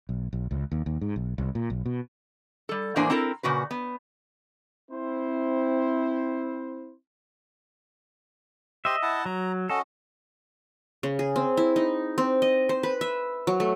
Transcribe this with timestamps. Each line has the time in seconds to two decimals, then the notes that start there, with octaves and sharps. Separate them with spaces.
0.09 B1
0.33 B1
0.51 C#2
0.72 D#2
0.86 D#2
1.01 G#2
1.16 B1
1.38 C2
1.55 A#2
1.70 B1
1.86 B2
2.69 G3 A4
2.96 E2 A2 A#3 D4 C5 G#5
3.10 C4 E4 A4 A#4
3.43 A#2 C#3 F#4 B4
3.71 B3
4.91 C4 E4 C5
8.85 G4 C5 D#5 E5 C6
9.02 E4 F#5 A5
9.26 F#3 A#5
9.70 C#4 F#4 A4 D#5
11.03 C#3
11.19 G#4
11.36 C4
11.57 E4
11.76 D#4
12.18 C4
12.42 D#5
12.69 C5
12.83 B4
13.01 E5
13.47 F#3
13.60 A3